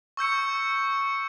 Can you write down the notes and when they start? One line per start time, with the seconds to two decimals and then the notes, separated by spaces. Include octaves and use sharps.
0.17 C#6 E6 G6 C#7